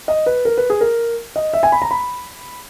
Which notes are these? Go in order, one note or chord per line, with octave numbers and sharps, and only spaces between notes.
D#5
B4
A#4
B4
G#4
A#4
D#5
E5
G#5
B5
A#5
B5